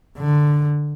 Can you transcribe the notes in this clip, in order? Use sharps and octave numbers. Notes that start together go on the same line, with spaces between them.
D3